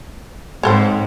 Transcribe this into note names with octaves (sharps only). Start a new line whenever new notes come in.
G#2 C4 A4 C#5